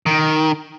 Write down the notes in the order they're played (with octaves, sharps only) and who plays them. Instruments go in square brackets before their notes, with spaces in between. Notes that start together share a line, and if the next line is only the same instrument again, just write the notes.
[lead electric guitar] D#3